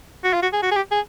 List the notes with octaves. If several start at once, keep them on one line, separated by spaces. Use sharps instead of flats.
F#4
F4
F#4
G#4
F#4
G#4
G4
G#4